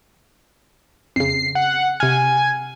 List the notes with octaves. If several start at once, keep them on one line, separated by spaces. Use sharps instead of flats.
F2 C#3 C7
F#5
C3 G#5 F6